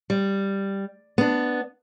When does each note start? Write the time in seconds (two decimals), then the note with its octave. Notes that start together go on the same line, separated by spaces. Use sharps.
0.10 G3
1.18 B3 D4